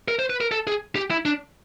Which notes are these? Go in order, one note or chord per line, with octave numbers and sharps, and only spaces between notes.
A#4
C5
B4
A#4
A4
G#4
G4
E4
D4